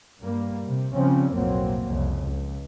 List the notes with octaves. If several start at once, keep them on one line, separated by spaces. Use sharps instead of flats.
G2 G3 A#3
C3
C#3 F3 G3 C4 C#4
B1 F2 A2 F#3 A#3 C4
C2 F2 C#3
C#2